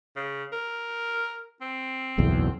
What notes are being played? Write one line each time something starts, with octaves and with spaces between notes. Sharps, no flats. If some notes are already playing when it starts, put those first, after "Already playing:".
C#3
A#4
C4
F#1 B1 E2